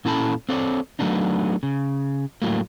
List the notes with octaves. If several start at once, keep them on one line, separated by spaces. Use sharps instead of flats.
A#2 C#4 E4 A4 A5 B5
C4 A4 C#5 D5
F#3 A3 B3 D4 D#4
C#3
A2 F#3 G3 A3 A#3